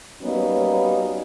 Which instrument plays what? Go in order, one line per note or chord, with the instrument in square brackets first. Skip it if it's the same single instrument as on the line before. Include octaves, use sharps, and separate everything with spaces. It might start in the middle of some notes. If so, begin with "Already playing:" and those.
[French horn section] F#3 G3 A#3 B3 C#4 D#4